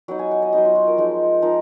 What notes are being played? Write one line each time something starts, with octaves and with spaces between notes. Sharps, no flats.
F#3 B3 D#4 F#5
G#5
F#5
D#5
F#3 B3 D#4 D#5
F4
F#4
A#4
F3 G#3 D#4
F3 G#3 D#4 A#4